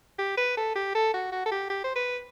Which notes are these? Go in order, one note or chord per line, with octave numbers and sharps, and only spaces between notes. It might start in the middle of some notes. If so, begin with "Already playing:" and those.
G4
B4
A4
G4
A4
F#4
F#4
A4
G4
G4
C5
B4